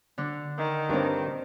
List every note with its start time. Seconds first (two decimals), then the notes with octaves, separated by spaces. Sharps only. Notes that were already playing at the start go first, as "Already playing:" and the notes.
0.18 D3 D4
0.58 D#3
0.90 G2 C4 D4 A#4 C#5